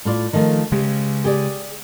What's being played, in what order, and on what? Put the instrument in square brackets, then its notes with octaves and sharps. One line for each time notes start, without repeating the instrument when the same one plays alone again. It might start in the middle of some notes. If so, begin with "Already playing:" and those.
[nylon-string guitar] A2 F4 D5
D#3 F3 A3
[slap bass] C#3 G#3 [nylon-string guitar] G4
[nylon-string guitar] G4 G#4 D5